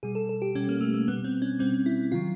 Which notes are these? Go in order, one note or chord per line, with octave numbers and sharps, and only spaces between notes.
B2 G3 G#4
A4
A4
G4
B2 G3 C#4
A#3
A3
A#3
B2 G3 B3
C4
C#4
B2 G3 C4
E4
C3 D#3 F#3 F4